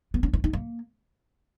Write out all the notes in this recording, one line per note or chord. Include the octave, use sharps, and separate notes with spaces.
B3
C#4
E4
D#4
A#3